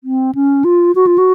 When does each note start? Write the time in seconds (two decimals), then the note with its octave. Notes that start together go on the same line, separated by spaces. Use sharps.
0.04 C4
0.35 C#4
0.64 F4
0.95 F#4
1.07 F4
1.18 F#4